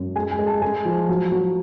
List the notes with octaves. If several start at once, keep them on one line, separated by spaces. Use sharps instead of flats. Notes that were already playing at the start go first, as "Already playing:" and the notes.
Already playing: F#2
G#3 G#5
G#5
G#3
A5
G#3 G#5
F3
F#3
F#3